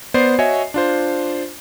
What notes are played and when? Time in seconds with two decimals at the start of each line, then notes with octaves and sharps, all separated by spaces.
0.14 B3 C5 D5 C7
0.39 F#4 C#5 D#5 E5 G#5
0.74 D4 F4 C5